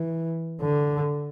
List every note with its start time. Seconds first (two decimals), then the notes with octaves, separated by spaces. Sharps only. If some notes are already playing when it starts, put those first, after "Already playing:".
Already playing: E3
0.61 D3